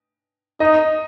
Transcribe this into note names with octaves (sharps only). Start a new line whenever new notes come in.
D#4 D#5